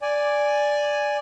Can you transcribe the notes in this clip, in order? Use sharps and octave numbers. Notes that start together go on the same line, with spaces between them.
D5 G#5